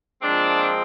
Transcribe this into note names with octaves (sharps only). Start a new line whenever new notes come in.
A#2 F3 G#3 C4 D4